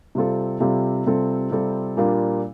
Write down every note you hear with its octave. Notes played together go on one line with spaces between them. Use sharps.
C3 G3 C4 F4 A4
C3 G3 C4 F4 A4
C3 G3 C4 F4 A4
C3 G3 C4 F4 A4
A#2 G3 A#3 D4 F4